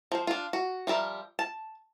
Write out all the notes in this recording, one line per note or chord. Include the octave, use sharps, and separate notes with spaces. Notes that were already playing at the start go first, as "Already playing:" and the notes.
F3 C5
D4 F4
F#4
F3 G3 A#4 E5
A5